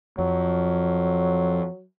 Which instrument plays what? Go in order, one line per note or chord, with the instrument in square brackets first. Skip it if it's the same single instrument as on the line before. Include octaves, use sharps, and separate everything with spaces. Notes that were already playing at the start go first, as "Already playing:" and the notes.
[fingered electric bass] F2 [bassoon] F#3